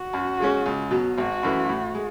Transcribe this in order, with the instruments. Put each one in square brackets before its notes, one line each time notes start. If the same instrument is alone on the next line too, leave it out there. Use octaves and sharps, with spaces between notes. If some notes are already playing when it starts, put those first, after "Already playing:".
Already playing: [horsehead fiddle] F#4
[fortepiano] F#2
C#3 G#3 C#4
C#2
B2 F#3
[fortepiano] G#1 [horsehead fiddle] F#4
[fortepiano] F#2 E3 A3
A2
G#3